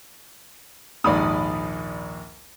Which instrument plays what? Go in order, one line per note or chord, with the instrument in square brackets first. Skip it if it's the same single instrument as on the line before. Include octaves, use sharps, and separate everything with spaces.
[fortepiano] A#1 D#2 G#2 [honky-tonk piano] D5 B5 D#6